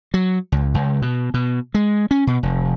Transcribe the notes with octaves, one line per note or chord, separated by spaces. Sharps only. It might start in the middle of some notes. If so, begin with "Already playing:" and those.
F#3
C#2
C#2
B2
B2
G#3
C#4
B2
F1